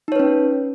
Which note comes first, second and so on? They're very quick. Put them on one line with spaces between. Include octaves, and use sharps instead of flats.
D#4 C#5 B4 C#4